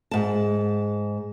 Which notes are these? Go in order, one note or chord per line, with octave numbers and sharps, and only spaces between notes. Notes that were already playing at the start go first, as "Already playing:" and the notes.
G#2 A5